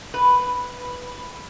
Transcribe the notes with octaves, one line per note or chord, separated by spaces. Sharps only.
B4